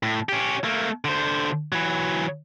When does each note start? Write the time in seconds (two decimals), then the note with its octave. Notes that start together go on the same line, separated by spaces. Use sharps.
0.03 A2
0.29 C#4 G4
0.64 A3 A#3
1.05 D3 C5
1.72 E3 F#3